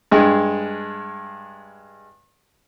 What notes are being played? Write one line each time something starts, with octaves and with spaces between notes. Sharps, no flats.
G2 G#3